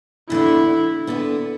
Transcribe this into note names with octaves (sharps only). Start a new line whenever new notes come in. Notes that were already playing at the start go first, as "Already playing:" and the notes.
E2 D3 A3 E4
D2 D3 B3